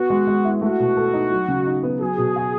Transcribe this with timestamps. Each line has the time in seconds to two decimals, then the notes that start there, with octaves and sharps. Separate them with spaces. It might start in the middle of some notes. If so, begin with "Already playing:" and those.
Already playing: B3 F#4
0.10 G#3
0.27 G#3
0.45 E4
0.62 A3 F#4
0.80 B2
0.97 A4
1.13 D#4
1.32 F#3
1.48 C#3
1.67 D#4
1.83 B3
2.01 F#3 G#4
2.18 B2
2.36 F#4